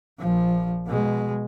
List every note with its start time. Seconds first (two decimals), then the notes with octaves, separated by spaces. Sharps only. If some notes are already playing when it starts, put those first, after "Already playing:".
0.19 A#1 F3
0.86 B2 G#3